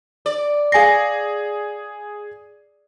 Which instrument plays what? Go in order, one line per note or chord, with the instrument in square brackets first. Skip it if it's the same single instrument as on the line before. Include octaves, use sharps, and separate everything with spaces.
[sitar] D5
[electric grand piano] G#4 C7 [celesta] F5 G#5 A#6